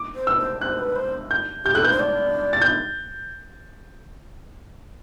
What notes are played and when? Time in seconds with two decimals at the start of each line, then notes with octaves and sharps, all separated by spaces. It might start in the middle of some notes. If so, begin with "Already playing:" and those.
Already playing: D6
0.15 C5
0.27 B4 E6
0.38 C5
0.61 C5 F#6
0.79 B4
0.96 C5
1.31 G6
1.64 G4 G6
1.74 A4 F#6
1.83 B4 G6
1.91 C5
2.00 D5
2.53 A6
2.62 G6